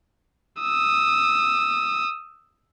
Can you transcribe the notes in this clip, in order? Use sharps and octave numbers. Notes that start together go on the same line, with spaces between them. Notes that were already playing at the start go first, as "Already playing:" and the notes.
D#6 E6